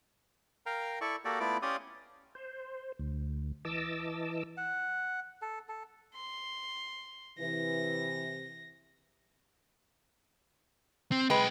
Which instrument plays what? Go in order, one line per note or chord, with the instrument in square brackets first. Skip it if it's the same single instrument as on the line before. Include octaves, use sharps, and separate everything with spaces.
[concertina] A#4 F5 G5 A#5
E4 A4 D5 C#6
A#3 F#4 G4 A4 D5
A3 B3 E4 F4 D5 D6
C#4 G4 D5 F5 C6 D#6
[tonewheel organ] C5
D2
E3 D#5 A5 D6 E6
[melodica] F#5
A4
A4
[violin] C6
[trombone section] C3 E3 [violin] A#6
[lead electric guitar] C4
[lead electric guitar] B1 G5 [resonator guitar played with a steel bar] G#3 B4